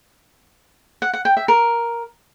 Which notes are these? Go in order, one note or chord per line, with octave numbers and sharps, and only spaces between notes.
F#5
F#5
G5
E5
A#4